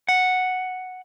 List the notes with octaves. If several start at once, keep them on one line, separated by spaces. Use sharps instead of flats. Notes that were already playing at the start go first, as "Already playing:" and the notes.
F#5